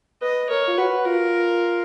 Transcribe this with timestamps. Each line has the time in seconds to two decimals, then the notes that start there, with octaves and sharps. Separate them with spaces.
0.22 B4 D#5
0.49 A#4 C#5
0.67 F4
0.78 F#4 B4
1.06 F4 A#4